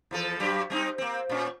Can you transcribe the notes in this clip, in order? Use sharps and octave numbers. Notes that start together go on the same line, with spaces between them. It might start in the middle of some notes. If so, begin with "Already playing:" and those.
E2 F3 A4
G2 F#3 G4
G3 C4 D#4
A#3 C4
A#2 C#4